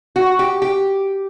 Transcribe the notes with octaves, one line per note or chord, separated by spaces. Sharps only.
F#4
G4
G4